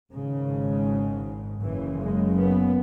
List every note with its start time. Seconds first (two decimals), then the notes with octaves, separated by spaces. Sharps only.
0.15 G#1 G#2 C#3
1.63 F#1 F#2 C#3 E3
2.00 G#3
2.38 B3